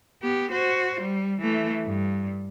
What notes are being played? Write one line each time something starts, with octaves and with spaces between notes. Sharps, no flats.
B3 G4
F#4 C5
G3
E3 A3
G2